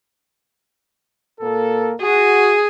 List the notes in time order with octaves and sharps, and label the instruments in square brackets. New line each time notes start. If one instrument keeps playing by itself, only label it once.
[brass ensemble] A#2 A#3 A4
[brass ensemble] F#4 [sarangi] G#4